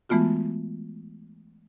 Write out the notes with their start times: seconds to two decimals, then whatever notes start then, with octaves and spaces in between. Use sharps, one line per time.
0.09 E3 G#3 A3 B3 F4 F#4